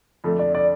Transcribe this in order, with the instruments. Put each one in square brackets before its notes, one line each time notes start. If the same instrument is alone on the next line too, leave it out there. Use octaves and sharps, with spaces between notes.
[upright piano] F2 D3 A3 D4
[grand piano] D5
D5